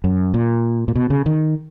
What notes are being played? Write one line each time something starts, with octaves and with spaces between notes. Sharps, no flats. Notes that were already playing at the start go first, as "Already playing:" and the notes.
F#2
A#2
A#2
B2
C#3
D#3